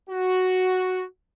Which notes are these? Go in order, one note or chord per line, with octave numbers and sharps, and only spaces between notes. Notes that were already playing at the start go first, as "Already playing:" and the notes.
F#4